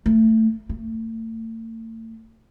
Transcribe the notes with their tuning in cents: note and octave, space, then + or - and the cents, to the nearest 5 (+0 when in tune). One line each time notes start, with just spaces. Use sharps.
A3 +15
A3 +40